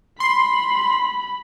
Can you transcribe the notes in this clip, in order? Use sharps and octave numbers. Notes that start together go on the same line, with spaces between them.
B5 C6